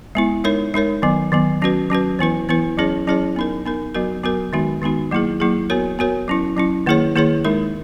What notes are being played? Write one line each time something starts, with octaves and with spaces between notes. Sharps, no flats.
G#3 B3 E4
G#3 D#4 A#4 C#5
G#3 D#4 A#4 C#5
D#3 F#3 B3
D#3 F#3 B3
F#3 C#4 F#4 B4
F#3 C#4 F#4 B4
E3 B3 E4 B4
E3 B3 E4 B4
F#3 C#4 E4 G#4 C#5
F#3 C#4 E4 G#4 C#5
B3 D#4 A#4
B3 D#4 A#4
F#3 B3 F#4 A#4
F#3 B3 F#4 A#4
D#3 G#3 B3 D#4 F#4
D#3 G#3 B3 D#4 F#4
F#3 A#3 E4 G#4
F#3 A#3 E4 G#4
B3 F#4 A#4 C#5
B3 F#4 A#4 C#5
F#3 C#4 E4
F#3 C#4 E4
D#3 A#3 E4 G#4 C#5
D#3 A#3 E4 G#4 C#5
G#3 D#4 A#4